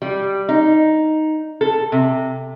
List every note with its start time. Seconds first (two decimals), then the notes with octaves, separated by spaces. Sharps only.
0.02 G3
0.49 D#4
1.61 A4
1.92 C3